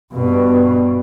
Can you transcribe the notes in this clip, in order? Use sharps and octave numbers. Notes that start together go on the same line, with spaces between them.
G2 B2